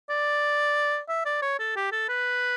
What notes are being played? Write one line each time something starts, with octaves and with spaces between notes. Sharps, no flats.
D5
E5
D5
C#5
A4
G4
A4
B4